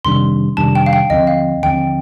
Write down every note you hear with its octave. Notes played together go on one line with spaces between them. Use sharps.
F2 C3 D#3 G3 D4 C6
F2 C3 D#3 G3 D4 A5
G5
F5
G5
D#2 D3 F3 C4 D#5
F5
D#2 D3 F3 C4 G5